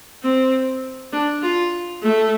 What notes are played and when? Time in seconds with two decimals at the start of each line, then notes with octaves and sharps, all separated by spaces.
0.23 C4
1.13 D4
1.43 F4
2.03 A3